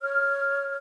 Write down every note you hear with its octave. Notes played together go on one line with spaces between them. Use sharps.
C#5 F6